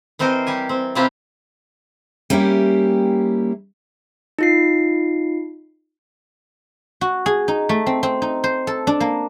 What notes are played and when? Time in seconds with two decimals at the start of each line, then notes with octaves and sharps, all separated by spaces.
0.19 E3 C4 A#4 C5 D#5
0.47 G3 G4 G#5
0.69 C4
0.95 C3 C4 E4 F4 G4 A#5
2.30 G3 A#3 C#4 E4 G4
4.39 D#4 F4 C7
7.01 F#4
7.26 G#4
7.48 D#4
7.69 A3
7.87 C4
8.03 C4
8.22 D#4
8.44 C5
8.67 A4
8.87 D4
9.00 A#3